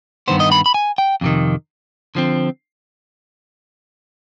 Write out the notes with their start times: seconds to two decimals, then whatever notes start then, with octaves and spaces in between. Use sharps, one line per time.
0.28 G2 D#3 B3 C5
0.40 D#5
0.52 B5
0.66 B5
0.74 G#5
0.98 G5
1.21 F2 C3 D#3
2.15 D3 F3 C4